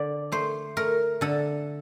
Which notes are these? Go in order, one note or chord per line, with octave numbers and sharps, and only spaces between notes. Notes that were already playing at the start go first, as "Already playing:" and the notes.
Already playing: D3 D5
A3 C5
A3 A#4
D3 A4